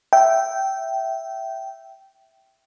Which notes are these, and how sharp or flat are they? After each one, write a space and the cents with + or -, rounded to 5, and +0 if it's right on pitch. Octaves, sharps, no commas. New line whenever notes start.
E5 +0 G5 -15